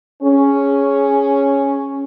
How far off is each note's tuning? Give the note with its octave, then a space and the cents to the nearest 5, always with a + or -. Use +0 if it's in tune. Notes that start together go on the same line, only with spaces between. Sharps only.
C#4 +0 G#4 +0